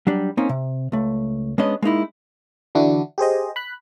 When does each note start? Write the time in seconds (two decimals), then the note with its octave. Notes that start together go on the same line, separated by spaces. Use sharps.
0.07 F#3 G3 D4
0.37 A#3 C4 C#4 D#4
0.49 C3
0.92 C#2 A3
1.58 G#3 B3 C#4 D4 D#5
1.82 G#3 A#3 D#4 E4
2.75 D3 E3 D4 E4 F#4
3.18 G4 G#4 C5 D#5
3.56 B5 F#6